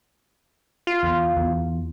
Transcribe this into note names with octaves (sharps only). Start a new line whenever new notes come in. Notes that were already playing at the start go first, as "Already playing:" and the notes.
F4
E2
E2